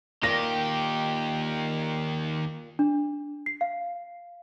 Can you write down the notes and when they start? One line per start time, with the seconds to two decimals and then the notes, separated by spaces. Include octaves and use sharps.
0.23 D#2 A#2 D#3 G4 A#6
2.79 D4
3.46 C7
3.61 F5